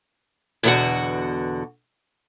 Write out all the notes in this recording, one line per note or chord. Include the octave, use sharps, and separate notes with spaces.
E2 B2 D3 G3 F#4 F#5